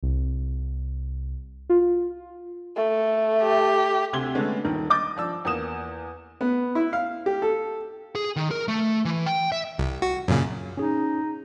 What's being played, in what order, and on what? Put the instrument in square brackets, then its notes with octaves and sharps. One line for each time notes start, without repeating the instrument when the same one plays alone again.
[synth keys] C2
F4
[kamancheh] A3
[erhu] G4
[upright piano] D2 C3 C6 G#6 G7
D3 G#3 A3 B3 C#4
D#1 D#3
D#5 D6 G6 A6
F3 D5 E6
E2 A#3 D#6 E7
[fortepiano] B3
E4
F5
G4
A4
[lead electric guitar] G#4
D#3
A#4
A3
E3
G5
E5
[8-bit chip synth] C2
F#4
F#2 A#2 C#3
[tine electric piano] C#4 G#4 [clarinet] D#4